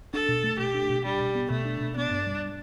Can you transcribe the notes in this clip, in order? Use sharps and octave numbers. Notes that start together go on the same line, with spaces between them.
D4 A4
B2
A3
B2 G4
D4
B2
G3 D4
B2
B3
B2 A3
D4
B2
B3 D4
G2
G3